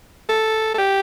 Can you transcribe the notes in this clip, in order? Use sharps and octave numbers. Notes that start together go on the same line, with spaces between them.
A4
A4
G4